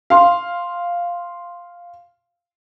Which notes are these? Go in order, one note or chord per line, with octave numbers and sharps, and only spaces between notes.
F5 C6